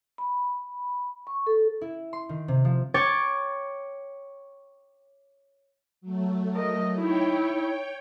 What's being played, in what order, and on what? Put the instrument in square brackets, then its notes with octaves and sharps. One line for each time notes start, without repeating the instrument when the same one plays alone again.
[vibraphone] B5
C#6
A4
[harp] E4
C6
D#3
C3
F3
C#5 G5 D6 A6
[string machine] F#3 A3
[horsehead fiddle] A#4 D#5
[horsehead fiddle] D#4 E4 [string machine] C#5 G5